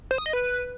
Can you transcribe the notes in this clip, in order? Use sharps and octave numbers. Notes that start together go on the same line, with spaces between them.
C5
D#6
D#5
B4